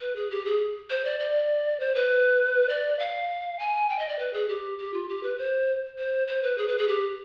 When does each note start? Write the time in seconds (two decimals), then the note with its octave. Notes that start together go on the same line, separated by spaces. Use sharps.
0.01 B4
0.16 G#4
0.31 G4
0.45 G#4
0.90 C5
1.05 D5
1.20 D5
1.80 C5
1.95 B4
2.69 D5
2.99 F5
3.59 G#5
3.89 G5
3.99 D#5
4.09 D5
4.19 B4
4.33 G#4
4.49 G4
4.79 G4
4.94 F4
5.09 G4
5.23 B4
5.38 C5
5.98 C5
6.27 C5
6.43 B4
6.58 G#4
6.68 B4
6.78 G#4
6.88 G4